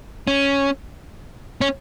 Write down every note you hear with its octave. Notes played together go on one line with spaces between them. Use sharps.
C#4
C#4